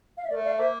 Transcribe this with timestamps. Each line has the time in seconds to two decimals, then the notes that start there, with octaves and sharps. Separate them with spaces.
0.16 F5
0.23 E5
0.29 A3 A#4 D5
0.44 D5 F5
0.59 A#3 C5 E5